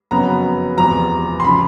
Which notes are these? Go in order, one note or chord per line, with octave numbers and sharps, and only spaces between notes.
F#1 F2 C#3 F#3 B3 A#5
F1 E2 C3 F3 A#5
C6
C#3 F3 B5